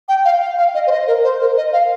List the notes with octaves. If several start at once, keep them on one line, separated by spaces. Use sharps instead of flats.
G5
F5
F5
F5
D#5
C5
D#5
A#4
C5
A#4
D#5
F5